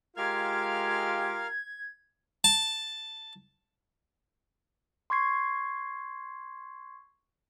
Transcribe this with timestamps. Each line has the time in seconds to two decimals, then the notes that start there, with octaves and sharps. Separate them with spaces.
0.17 G#3 F4 G4 A#4 F5 F6 G#6
2.44 A5
5.10 C6 C#6 G#6 C7